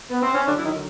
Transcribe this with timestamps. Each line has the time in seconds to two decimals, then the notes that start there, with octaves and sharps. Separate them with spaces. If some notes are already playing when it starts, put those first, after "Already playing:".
0.10 B3
0.22 C4
0.35 C#4
0.46 D3 F#3 D4
0.58 E4
0.65 D#3 D#4
0.73 D3